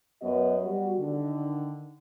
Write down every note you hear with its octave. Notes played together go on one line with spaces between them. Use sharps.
F#2 B3 F#4 B4 D#5
G3 B3 F#4
D3 D#3